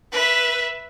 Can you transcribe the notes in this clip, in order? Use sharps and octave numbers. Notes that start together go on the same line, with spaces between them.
B4 E5